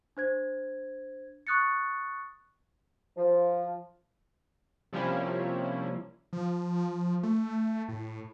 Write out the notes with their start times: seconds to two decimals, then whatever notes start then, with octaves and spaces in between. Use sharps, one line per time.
0.17 D4 C5 G#6
1.47 C#6 D#6 F#6 A6 C#7
3.17 F3
4.93 C3 F3 G3 A#3 C#4 E4
6.33 F3
7.23 A3
7.89 A2